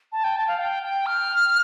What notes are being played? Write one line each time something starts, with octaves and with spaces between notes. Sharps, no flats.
A5
G5
A5
F5
G5
G5
F6